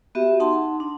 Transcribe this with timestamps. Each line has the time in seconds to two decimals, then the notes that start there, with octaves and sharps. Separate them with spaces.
0.15 B3 F#4 G4 E5
0.40 D#4 F#5 A5 C6
0.80 D4